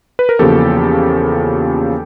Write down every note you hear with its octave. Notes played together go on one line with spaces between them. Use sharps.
B4
A#4
E2 C#3 F3 A#3 G4 A4